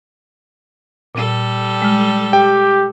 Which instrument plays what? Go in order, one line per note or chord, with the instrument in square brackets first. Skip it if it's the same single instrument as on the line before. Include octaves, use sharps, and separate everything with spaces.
[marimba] A#2 [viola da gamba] G3 A4
[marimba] G#3 F6
[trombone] G4 [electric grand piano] G5